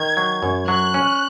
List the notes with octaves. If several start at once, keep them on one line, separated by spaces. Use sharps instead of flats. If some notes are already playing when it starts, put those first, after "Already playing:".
Already playing: D#3 G#6
F#3
F#2
F#3 F#6
C#4